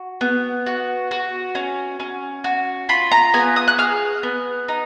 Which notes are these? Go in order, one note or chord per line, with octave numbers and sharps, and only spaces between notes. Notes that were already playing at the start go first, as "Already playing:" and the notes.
Already playing: F#4
B3
F#4
F#4
C#4
C#4
F#4
F4 B5
A#5
B3 G#5
D#6
F#6
G#4 F6
B3
D#4